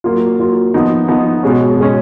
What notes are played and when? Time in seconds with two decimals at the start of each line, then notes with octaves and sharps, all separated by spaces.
0.04 F#3 A#3 F4
0.39 F#3 A#3 F4
0.74 F3 B3 D#4
1.08 F3 B3 D#4
1.43 B2 G#3 C#4
1.77 B2 G#3 C#4